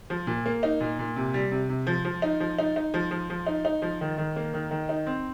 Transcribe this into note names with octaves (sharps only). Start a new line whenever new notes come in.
F3
A#2
A#3
D#4
A#2
A#2
C3
G3
C3
C3
F3
F3
D#4
F3
D#4
D#4
F3
F3
F3
D#4
D#4
F3
D#3
D#3
A#3
D#3
D#3
D#4
C4